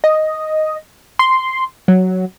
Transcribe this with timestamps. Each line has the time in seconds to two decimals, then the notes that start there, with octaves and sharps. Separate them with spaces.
0.04 D#5
1.19 C6
1.88 F#3